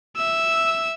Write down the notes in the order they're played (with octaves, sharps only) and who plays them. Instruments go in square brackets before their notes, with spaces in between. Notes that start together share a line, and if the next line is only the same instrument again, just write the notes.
[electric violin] E5 E6